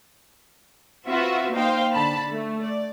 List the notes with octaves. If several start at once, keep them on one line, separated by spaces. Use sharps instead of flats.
C4 F4 F#4 B4 E5
A#3 D#4 C5 F5 G5
D3 A5 B5
A3
D5